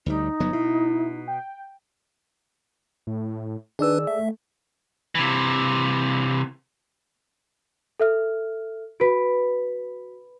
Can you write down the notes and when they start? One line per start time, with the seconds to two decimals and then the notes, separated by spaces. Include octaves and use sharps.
0.06 D2 G3 D#4
0.40 G1 F#3 B3
0.53 B2 E4
1.28 G5
3.07 A2
3.79 D#3 D4 G#4 B4 D5 E6
4.07 A3 E5
5.15 C3 E3
8.00 A4 E5 F6
9.00 F#4 B4 B6 D7